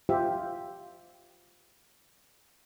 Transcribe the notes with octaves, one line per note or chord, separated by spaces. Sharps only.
F4 G4 C5 E5